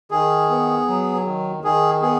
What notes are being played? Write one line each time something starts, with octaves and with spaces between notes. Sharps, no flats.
D#3 G#4
B3
F#3
D#3
D#3 G#4
B3 G#4